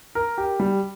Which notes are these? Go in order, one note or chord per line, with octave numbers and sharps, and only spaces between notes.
A#4
G4
G3